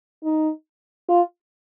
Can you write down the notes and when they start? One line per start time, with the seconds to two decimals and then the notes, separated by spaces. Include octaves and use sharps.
0.24 D#4
1.09 F4